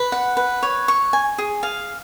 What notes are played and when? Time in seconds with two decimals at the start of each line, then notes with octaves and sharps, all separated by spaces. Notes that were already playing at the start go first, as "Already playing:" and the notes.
Already playing: B4
0.12 F#5
0.37 B4
0.63 C#5
0.88 C#6
1.13 G#5
1.38 G#4
1.63 F5